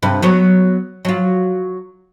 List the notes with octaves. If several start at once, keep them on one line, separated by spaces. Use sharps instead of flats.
G2 C3 B4
F#3 B3 C#5
F#3 F4